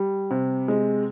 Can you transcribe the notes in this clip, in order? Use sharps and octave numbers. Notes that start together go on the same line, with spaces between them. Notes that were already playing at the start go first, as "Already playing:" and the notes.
Already playing: G3
C3
G#3